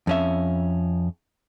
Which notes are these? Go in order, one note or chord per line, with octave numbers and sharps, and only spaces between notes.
F2 C#4 E5